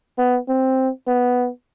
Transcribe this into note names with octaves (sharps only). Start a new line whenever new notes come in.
B3
C4
B3